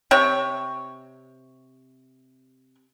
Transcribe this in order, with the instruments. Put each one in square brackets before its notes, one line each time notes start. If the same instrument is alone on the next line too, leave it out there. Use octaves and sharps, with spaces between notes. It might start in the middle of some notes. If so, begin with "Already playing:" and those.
[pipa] C3 C4 C#5